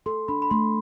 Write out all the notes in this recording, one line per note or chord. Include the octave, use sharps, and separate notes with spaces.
A4 C6
D4 B5
B5
A3 C6